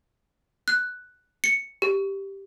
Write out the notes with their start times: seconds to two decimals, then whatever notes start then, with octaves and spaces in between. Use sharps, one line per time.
0.68 F#6
1.44 C#7
1.82 G4